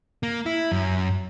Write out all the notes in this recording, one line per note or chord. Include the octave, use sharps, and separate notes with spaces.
A#3
E4
F#2